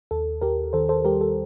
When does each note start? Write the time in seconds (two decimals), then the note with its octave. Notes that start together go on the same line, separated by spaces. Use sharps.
0.11 D#2 A4
0.41 D#2 G4 A#4
0.73 D#3 A4 C5
0.89 A4 C5
1.05 G3 G4 A#4
1.21 A4